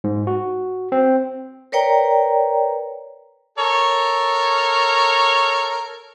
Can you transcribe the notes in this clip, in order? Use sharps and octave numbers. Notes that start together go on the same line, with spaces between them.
G#2
F#4
C4
A#4 B4 C#5 D5 G5 A#5
A4 A#4 C#5